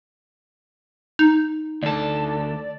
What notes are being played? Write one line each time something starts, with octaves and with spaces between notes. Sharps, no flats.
D#4
D2 A4 D5